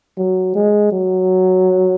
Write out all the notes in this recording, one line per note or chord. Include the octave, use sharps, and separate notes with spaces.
F#3
G#3
F#3